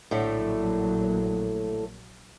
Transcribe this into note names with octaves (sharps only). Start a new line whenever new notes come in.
A#1 A2 D3 F#3 A3 A#3